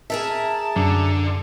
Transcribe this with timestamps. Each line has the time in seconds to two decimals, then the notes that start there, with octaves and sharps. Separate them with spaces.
0.10 G#4 A#4 E5 A5
0.76 F#2 D3